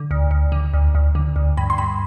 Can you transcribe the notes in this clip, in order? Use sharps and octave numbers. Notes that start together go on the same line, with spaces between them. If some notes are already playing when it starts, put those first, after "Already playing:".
Already playing: D3
D2
D2
D3
D2
D2
D3
D2
G2 B5
C6
G2 B5